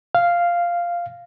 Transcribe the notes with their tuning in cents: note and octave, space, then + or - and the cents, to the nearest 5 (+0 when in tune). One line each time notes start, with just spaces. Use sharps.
F5 -5